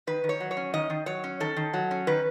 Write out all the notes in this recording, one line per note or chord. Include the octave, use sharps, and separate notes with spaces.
D#3 B4
D#3
C#5
F#3
C#5
C#4
D#3 D#5
D#3
F#3 C#5
C#4
D#3 A4
D#3
F#3
C#4
D#3 B4